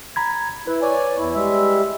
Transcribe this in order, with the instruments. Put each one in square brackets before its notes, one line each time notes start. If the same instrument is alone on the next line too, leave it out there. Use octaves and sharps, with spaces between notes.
[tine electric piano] A#5 B5 G#6
[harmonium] E4 [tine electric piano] B4
[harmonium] C#5 D5 G#5
E2 E4
G3 G#3 E5